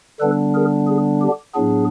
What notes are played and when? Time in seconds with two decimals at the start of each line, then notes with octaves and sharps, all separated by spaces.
0.20 D3 G3 B3 D4 A4 B4
0.55 G#4 A#4
0.87 G#4
1.21 G4
1.54 A2 F#3 B3 D4 G#4